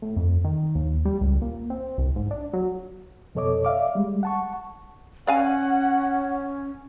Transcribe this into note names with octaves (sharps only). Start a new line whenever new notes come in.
A2
F2
D#3
D#2
G3
C#2
A#2
C4
C2
G#2
D4
F#3
F2 B2 A4 C#5 D#5 D6
D5 E5 F5 D6
G3 G#3
F#5 A5 C#6
C#4 D5 F5 F#5 G#5